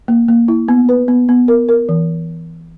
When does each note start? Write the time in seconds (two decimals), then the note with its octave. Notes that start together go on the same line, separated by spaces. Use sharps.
0.08 A#3
0.28 A#3
0.48 E4
0.68 B3
0.89 B4
1.08 B3
1.29 B3
1.48 A#4
1.68 A#4
1.89 E3